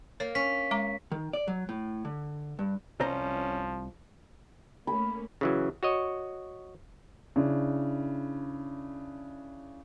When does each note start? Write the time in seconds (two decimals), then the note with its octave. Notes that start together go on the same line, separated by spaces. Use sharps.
0.20 A#3 C#5
0.35 C#4 B6
0.71 G#3 A#5 D6
1.12 D#3
1.33 D5
1.48 F#3
1.69 A2
2.05 D3
2.59 G2
3.00 C2 F3 C#4 C5 A#5
4.87 A3 A#3 C#4 B5
5.41 C#3 E3 F#3
5.83 F#4 C#5 D#5
7.36 C#3 D4 E4